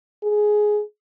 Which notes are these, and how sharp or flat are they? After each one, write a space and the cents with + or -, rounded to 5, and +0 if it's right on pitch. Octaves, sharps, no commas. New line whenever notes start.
G#4 +10